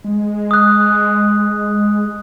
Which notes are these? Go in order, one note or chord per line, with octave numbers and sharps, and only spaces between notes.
G#3
D#6 F#6